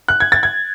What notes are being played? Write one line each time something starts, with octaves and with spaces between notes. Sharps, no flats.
F#6
G#6
A6
G#6